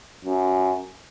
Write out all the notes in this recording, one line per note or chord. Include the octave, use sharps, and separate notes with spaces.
F#2